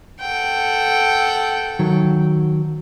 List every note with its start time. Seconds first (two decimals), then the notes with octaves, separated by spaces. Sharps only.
0.21 A4 F#5 G5
1.79 D#3 F#3